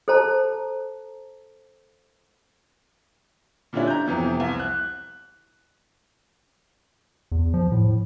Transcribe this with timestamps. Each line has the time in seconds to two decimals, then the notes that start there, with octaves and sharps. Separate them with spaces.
0.08 A4 C5 A5 A#5
3.73 A#2 D3 G3 C#4 D4 E4
3.87 A#5 G6
4.06 F2 C3 E3 B3
4.40 C2
4.60 F#6
7.32 E2
7.54 F3
7.72 A2